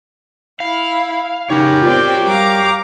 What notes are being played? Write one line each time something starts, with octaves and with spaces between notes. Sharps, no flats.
E4 F5
C#3 D#4 G4 A#4 C#5
C4 F4 D5 G5
G3 F5 A#5 D6